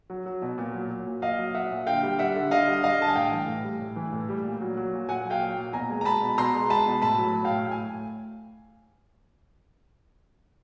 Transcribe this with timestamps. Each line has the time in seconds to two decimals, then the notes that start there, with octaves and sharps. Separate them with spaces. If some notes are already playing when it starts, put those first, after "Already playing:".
0.10 F#3
0.26 F#3
0.42 B2
0.58 A#2
0.74 F#3
0.90 F#3
1.06 A#2
1.22 A#2 D#5 F5
1.39 F#3
1.55 F#3 E5 F#5
1.71 A#2
1.86 D3 F5 G5
2.03 G3
2.19 G3 E5 F#5
2.36 D3
2.51 D3 D#5 F5
2.67 G3
2.83 G3 D#5 F5
3.00 D3 A5
3.08 G#5
3.16 A2 F5 G5
3.32 E3
3.48 A2
3.64 G3
3.80 A2
3.96 E3
4.12 A2
4.29 G3
4.45 A#2
4.61 F#3
4.77 F#3
4.93 A#2
5.09 A#2 F#5 G#5
5.25 F#3
5.30 F5 G5
5.41 F#3
5.57 A#2
5.73 B2 G#5 A#5
5.90 G#3
6.01 A#5
6.05 G#3 A5 B5
6.22 B2
6.38 B2 A#5 C6
6.54 G#3
6.70 G#3 A5 B5
6.86 B2
7.02 A2 A5 B5
7.18 F#3
7.34 F#3
7.45 F5 G5
7.51 A2
7.67 A2 G#5